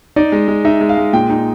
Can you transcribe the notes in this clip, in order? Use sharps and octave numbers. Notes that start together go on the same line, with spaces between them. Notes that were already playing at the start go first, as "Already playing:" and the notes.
D#4 D5
G#3
G#3
D#4 E5
G#3
F5
G#3
A#2 G5
D#4